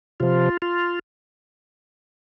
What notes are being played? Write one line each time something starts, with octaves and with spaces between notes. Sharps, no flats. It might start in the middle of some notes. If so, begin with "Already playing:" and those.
C3 F3 F4
F4